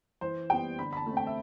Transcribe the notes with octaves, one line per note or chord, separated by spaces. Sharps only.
E3 C5
G3 B3 G5
D3 B5
B5
A5
A3
C4
G5
E5